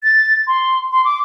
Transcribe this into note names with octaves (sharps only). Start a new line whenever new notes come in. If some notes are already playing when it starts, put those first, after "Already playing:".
A6
C6
C6
D6